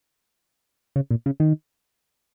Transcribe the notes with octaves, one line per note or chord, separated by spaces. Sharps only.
C#3
A#2
C#3
D#3